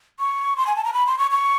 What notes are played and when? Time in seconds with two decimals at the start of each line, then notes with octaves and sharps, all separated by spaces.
0.19 C#6
0.57 C6
0.67 G#5
0.76 A5
0.84 A#5
0.93 B5
1.06 C6
1.18 C#6
1.31 C#6